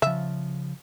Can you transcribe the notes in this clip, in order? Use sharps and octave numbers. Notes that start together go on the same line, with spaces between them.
C#3 F3 E5